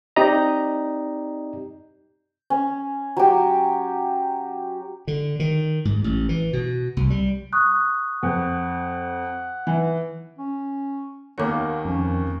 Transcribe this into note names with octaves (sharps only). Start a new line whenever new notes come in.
C4 D#4 G4 D5 D#5 A#5
C#4
F#3 G4
D3
D#3
G#2
A1
E3
B2
C2
G3
C#6 D#6 F#6
F2 F#5
E3
C#4
D#2 D#3 A#3 B3 C#5 D6
F2 C#4